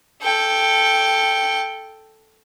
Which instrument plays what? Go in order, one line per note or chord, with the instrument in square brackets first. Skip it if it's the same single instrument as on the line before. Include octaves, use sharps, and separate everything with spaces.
[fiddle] A4 G5